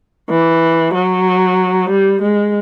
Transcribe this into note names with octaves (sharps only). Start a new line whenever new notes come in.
E3
F#3
G3
G#3